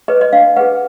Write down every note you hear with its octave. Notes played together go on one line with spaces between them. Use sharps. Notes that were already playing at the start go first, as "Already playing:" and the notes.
G#4 B4 D#5
D#5
D4 F5
G#4 B4 F#5